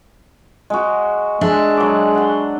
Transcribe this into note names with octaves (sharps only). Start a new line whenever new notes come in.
G#3 F#4
G#3 D4 E5
F#3 D6
F#5 C6